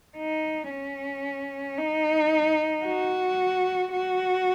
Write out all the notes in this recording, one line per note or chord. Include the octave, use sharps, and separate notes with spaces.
D#4
C#4
D#4
F#4
F#4